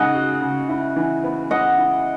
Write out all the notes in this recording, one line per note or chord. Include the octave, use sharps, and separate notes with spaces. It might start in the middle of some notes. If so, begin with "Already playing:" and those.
Already playing: C#3 G#3 D#4 D#5 F#5
F#4
C#3
E4
E3
B3
G#3 D#5 F#5
E4